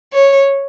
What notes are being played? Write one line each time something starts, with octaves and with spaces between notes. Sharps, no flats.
C#5